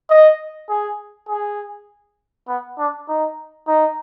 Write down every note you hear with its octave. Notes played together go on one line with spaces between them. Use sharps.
D#5
G#4
G#4
B3
D4
D#4
D#4